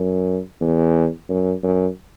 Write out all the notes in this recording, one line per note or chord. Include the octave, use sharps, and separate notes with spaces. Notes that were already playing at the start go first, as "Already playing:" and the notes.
Already playing: F#2
E2
F#2
F#2